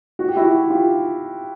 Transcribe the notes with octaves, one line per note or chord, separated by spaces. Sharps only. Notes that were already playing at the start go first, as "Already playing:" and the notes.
F#4
G4
E4 F#4
F4 G4